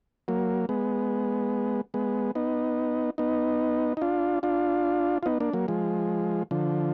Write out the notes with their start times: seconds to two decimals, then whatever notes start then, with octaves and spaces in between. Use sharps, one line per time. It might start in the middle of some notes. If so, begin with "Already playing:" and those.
0.28 F#3 A#3
0.69 G#3 B3
1.94 G#3 B3
2.35 B3 D#4
3.18 B3 D#4
3.97 D#4
4.02 D4 F4
4.43 D4 F4
5.23 F4
5.26 B3 D#4
5.40 A#3 D4
5.53 F#3 A#3
5.68 F3 G#3
6.51 D3 F3